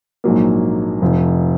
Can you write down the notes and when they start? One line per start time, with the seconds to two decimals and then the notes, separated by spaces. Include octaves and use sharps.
0.24 A#1 G#2 F#3 A#3
1.01 F1 F2 F3